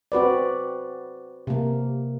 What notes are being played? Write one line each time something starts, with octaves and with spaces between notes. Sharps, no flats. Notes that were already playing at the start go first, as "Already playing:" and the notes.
C4 F#4 B4 D5
C3 A#3